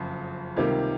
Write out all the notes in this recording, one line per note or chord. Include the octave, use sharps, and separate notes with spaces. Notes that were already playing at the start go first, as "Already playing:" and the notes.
Already playing: F#1 F2 C#3
C#2 C3 D#3 G3 A#3